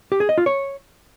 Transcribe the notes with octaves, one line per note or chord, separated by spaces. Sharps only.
G4
G#4
D#5
F4
C#5